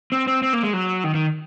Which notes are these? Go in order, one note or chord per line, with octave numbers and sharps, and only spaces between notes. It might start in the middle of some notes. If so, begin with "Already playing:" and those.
C4
C4
C4
A#3
G#3
F#3
D#3
D#3